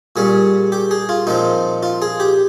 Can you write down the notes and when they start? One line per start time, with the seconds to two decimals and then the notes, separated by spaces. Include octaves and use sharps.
0.16 A#2 G3 C#4 G#4
0.72 G4
0.91 G#4
1.09 F4
1.27 A#2 F3 C4 D#4
1.83 F4
2.02 G#4
2.20 G4